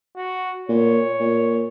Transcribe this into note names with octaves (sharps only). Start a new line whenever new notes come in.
F#4
A#2 C#5
A#2